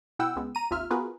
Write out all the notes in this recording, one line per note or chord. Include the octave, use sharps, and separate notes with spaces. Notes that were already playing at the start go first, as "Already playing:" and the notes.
B2 E4 F#5 G5 E6
C#2 C#3 G#3 B3
A#5 D#7
G#1 D#2 C3 F4 E5 F6
B3 F4 F#4 G#4 A#4 B4